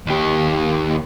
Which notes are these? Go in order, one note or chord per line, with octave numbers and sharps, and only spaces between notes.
D#2 G4